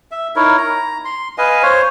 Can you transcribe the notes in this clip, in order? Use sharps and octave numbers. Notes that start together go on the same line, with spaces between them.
E5
D#4 E4 A#4 C#5
A#5
C6
B4 D#5 F5 G#5
C5 C#5